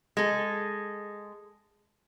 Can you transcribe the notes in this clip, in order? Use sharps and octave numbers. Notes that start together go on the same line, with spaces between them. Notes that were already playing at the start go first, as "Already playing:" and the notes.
G#3 A4